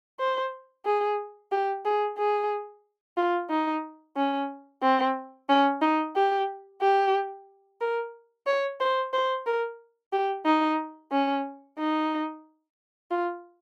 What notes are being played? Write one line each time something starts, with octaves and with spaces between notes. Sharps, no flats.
C5
G#4
G4
G#4
G#4
F4
D#4
C#4
C4
C#4
D#4
G4
G4
A#4
C#5
C5
C5
A#4
G4
D#4
C#4
D#4
F4